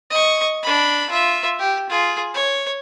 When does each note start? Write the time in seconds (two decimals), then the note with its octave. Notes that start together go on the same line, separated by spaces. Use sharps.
0.10 D#5 C#6
0.63 D4 B5
1.10 F4 E5
1.59 G4
1.90 F4 G#4
2.34 C#5